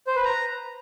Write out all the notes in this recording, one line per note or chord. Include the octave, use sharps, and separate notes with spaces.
C5
B4
A#5